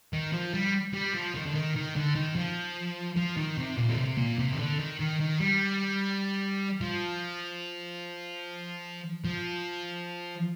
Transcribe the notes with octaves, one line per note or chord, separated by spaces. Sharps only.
D#3
F3
G3
G3
F3
D#3
D3
D#3
D#3
D3
D#3
F3
F3
D#3
C3
A#2
D3
C3
A#2
C3
D#3
D3
D#3
D#3
D#3
G3
F3
F3